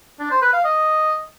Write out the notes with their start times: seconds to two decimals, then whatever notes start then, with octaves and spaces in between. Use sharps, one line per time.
0.19 D4
0.31 C5
0.42 B4
0.53 F5
0.64 D#5